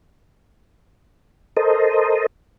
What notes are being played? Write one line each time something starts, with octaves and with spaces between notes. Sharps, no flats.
A4 A#4 C5 D#5